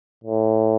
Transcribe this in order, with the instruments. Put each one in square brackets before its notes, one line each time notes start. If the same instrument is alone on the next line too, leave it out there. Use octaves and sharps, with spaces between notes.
[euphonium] A2